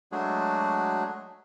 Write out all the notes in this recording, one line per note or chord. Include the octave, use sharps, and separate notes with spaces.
F#3 G#3 A3 D4 F#4 G#4